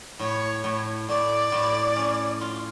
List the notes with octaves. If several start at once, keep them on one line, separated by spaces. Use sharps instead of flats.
A2 C#5
A2
A2 D5
A2
C#4
F4